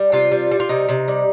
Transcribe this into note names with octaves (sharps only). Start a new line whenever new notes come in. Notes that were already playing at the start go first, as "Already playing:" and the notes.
Already playing: G3
C3 F4
G3
G3
F4
C3 D#4
C3
G3